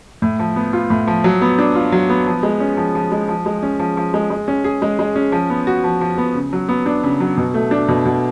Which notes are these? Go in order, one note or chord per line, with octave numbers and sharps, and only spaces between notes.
A2
F3
B3
F4
A2
F3
F#3
B3
D4
F4
F#3
B3
F3
G#3
C#4
F3
F3
G#3
F3
G#3
C#4
F3
F3
G#3
G#3
C#4
G#4
G#3
G#3
C#4
F3
B3
F#4
F3
F3
B3
C#3
F#3
B3
D4
C#3
F#3
B2
A3
D4
B2
B2